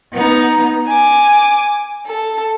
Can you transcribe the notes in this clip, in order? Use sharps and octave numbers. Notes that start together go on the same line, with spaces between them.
B3 D#4
G#5 D6
A4